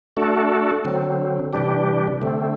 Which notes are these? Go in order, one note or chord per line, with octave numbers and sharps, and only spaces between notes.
A3 D4 F#4 A4
D3 F#3 C4
C3 E3 G3 D4 G4
D3 A3 C4